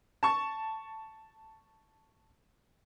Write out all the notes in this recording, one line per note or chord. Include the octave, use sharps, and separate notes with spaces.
A5 C#6